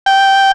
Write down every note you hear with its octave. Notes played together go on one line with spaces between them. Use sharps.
G5